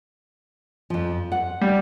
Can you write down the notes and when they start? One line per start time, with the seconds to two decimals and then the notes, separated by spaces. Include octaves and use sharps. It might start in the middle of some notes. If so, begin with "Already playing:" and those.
0.90 F2 F3
1.32 F#5
1.61 G3